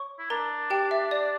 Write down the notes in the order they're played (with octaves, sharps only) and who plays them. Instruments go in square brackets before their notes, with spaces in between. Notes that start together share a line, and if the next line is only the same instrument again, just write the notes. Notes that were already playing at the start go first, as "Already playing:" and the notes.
Already playing: [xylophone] C#5 C#6
[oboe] E4
[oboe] D4 [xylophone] A#4 A#5
[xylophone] G4 G5
E5
D5